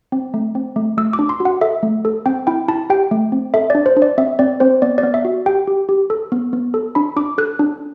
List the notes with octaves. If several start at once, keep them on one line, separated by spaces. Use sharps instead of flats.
C4
A3
C4
A3
A3 E6
D6
D4
C6
F#4
F#5
A4 E5
A3
A4
C4 G5
E4 G5
E4 A5
G4 G5
A3
C4
A4 E5
D5
D4
C5
D4
D5
C4 E5
C4 D5
C4 C5
B3 D5
D5
B3
E5
F#4
G4 G5
G4
G4
A4
B3
B3
A4
D4 B5
D4 D6
A4 F#6
D4